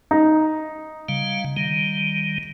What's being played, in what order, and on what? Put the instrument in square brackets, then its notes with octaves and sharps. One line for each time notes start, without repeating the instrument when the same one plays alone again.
[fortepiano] D#4
[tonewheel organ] C#3 G3 F5
D#3 G3